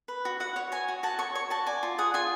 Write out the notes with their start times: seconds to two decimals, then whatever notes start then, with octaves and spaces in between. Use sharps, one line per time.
0.08 B4
0.25 F#4
0.40 F#4 F#5
0.56 C#5
0.72 C#5 G#5
0.88 F#4
1.03 F#4 A5
1.19 C#5 C#6
1.35 C#5 C#6
1.50 F#4 A5
1.66 D5 G#5
1.83 F4
1.98 G#4 F#5
2.14 F4 G#5